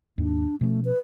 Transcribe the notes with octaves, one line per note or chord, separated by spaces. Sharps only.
D#2 G#2 D4
B2 F3 A3 C#4
B4